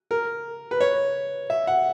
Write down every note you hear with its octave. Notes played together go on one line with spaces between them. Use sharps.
A#4
B4
C#5
E5
F#5